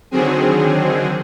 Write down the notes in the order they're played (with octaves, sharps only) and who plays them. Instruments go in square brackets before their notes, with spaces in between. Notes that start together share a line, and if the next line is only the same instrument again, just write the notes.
[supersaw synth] D3 D#3 F#3 C4 G#4